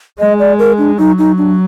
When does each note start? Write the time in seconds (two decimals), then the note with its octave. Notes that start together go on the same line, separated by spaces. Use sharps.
0.19 G#3 D#5
0.39 D5
0.59 A#4
0.78 D4
0.98 F#3 D#4
1.18 D#4
1.38 D4